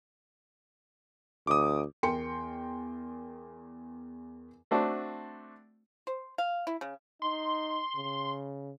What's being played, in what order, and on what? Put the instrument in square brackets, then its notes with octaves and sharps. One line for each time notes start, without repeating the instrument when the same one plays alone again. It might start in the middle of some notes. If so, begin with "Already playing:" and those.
[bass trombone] D2 [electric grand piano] D6 D#6
[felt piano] E2 A#4 G5 C6 C#7
[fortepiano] A3 C4 D4 F#4
[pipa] C5
F5
E4
C#3
[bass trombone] D#4 [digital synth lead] C6
[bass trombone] C#3